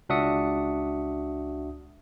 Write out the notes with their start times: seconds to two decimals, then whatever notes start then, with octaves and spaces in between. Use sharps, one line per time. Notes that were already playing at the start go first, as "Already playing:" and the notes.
0.09 C#2 D4 F#4 E5 D#6 C#7